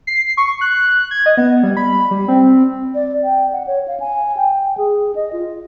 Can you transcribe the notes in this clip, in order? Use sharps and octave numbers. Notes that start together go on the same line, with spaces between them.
C7
C#6
F#6
G#6
D#5
B3
G3
B5
G3
C4
D5
G5
F#5
C#5
F5
G#5
G5
G#4
D#5
F4